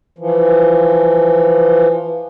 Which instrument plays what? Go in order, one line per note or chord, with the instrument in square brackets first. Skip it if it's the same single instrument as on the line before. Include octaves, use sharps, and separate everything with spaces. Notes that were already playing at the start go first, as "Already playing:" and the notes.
[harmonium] E3 F3